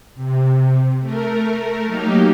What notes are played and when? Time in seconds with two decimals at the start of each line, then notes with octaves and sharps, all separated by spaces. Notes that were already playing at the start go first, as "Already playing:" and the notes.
0.14 C3
0.99 A3 A#4
1.85 F#3 A#3 D#4 G4